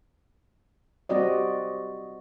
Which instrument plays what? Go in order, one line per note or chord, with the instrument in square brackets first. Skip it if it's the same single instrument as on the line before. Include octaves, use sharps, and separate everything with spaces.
[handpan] G3 C4 F#4 D5 D#5